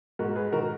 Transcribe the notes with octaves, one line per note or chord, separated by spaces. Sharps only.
G#2 F#4 A#4
G#4 B4
D#3 F#4 A#4